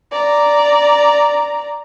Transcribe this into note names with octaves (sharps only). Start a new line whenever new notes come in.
D5 A#5